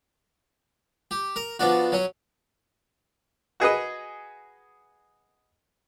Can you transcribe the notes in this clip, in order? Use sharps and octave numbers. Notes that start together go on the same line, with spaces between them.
G4
A#4
F3 B3 D4 F#4
F#3 C#4
F#4 G#4 B4 D#5